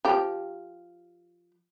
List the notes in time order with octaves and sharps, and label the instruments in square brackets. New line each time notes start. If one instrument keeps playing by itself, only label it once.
[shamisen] F3 G4